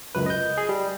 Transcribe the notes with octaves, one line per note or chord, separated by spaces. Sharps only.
C#2 F#2 B4
D#5 G6
G#4
G3